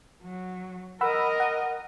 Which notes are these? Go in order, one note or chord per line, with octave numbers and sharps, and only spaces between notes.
F#3
A#4 D#5 F#5 B5 E6
F#5